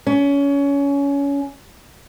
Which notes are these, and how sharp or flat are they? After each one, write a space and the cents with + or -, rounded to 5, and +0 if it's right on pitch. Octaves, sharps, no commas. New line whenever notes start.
C#4 +25